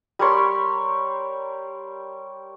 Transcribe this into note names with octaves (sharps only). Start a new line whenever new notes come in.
G3 A#4 C#5 C6